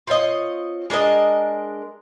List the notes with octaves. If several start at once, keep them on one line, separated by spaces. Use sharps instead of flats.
C4 F4 C#5 D#5
G#3 D4 A#4 D#5